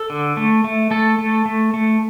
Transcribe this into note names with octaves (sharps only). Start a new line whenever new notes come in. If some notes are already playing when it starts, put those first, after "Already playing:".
Already playing: A4
D3
A3
A3
A3 A4
A3
A3
A3